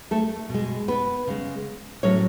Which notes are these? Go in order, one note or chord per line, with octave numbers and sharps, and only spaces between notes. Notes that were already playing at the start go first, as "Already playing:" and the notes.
A3 A4
B2
G#3
B3 B4
C#3 G#3
A2 F#3 A3 C#4 C#5